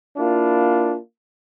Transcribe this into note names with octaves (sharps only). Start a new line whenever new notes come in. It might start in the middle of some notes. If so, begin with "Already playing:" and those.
A#3 D4 E4 F4